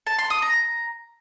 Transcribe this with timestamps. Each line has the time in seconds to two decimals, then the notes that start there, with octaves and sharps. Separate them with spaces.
0.07 A5
0.18 C6
0.30 D#6
0.42 A#5